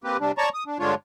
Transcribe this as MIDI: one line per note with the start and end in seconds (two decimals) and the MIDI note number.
0.04 0.17 58
0.04 0.17 60
0.04 0.17 67
0.04 0.17 71
0.20 0.32 48
0.20 0.32 55
0.20 0.32 62
0.38 0.49 73
0.38 0.49 74
0.38 0.49 81
0.38 0.49 82
0.38 0.49 85
0.54 0.64 87
0.66 0.78 62
0.79 0.95 43
0.79 0.95 50
0.79 0.95 56
0.79 0.95 62
0.79 0.95 65
0.79 0.95 73